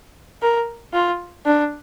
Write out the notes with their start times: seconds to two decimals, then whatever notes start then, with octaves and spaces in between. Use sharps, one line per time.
0.42 A#4
0.94 F4
1.46 D4